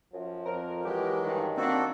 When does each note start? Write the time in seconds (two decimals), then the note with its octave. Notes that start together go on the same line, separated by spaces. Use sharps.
0.13 F#2 F3
0.46 F2 A#4
0.85 E3 F#3 G#3 G4
1.23 G2 D#3
1.57 A#3 C4 D4 F#4 A4